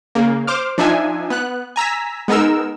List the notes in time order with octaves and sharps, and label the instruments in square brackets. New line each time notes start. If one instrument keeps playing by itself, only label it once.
[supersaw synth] C#3 A#3
C5 D6 F6
F3 D4 D#4 E5 G#5
B3 F#6
G#5 A#5 E6 B6
G#3 B3 D#4 A#4 E6